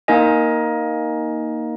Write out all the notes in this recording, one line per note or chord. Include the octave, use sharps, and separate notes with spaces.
A#3 D#4 A#4 D#5 G#5